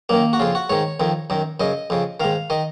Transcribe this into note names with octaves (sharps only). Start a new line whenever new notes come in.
F#2 D#3 A#3
F#4
F2 C#3 F4
F#4
G#2 D#3 C#5
F2 D#3
F#2 D#3
F#2 C#3 D#5
F2 C#3
G#2 D#3 F5
D#3 D#5